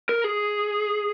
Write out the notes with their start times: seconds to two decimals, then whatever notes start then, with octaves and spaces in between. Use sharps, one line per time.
0.09 A#4
0.24 G#4